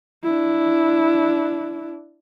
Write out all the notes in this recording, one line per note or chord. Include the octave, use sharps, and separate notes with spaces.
D4 E4